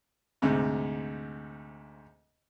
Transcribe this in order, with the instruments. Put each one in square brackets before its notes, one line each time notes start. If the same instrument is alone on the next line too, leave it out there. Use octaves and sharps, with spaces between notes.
[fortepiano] D2 G#2 C3